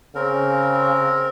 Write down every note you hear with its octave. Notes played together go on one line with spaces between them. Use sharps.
C#3 C4 A#4